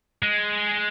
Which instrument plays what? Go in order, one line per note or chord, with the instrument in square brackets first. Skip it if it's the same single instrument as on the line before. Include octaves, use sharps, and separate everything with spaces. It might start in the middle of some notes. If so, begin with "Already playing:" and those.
[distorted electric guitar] G#3